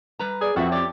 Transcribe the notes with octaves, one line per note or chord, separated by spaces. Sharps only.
G3 B4 A#5
G#4 D5
F2 C4 F#4 A4 B4 E5
G4 C#5 D5